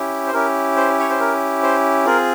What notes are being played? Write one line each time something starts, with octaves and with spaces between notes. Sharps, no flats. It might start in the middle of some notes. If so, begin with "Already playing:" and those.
Already playing: C#4 E4 G4
C5
C#4 E4 G4 A#4
C5
C#5
C5
A#4
C5
C4 F4 G#4 A#4